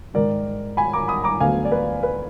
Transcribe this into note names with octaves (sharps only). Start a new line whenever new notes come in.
G#2 D#3 G#3 A#4 D5
G#5 B5
A#5 D6
B5 D#6
A#5 D6
D2 D3 F#3 B3 F5 G#5
D5
B4
B4